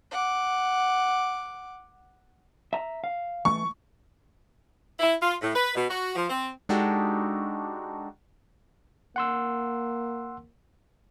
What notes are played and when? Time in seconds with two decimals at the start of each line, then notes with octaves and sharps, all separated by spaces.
0.11 F#5 D6
2.73 E5 A#5
3.04 F5
3.45 E3 A3 C#6
4.99 E4
5.21 F4
5.41 A2
5.55 B4
5.75 B2
5.90 F#4
6.15 F3
6.29 C4
6.69 G#3 D4 D#4 F#4 G4 A4
9.16 A#3 F#5 C6 E6